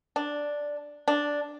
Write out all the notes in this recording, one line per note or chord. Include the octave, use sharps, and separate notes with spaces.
D4
D4